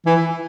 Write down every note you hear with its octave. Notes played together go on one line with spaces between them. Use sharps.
E3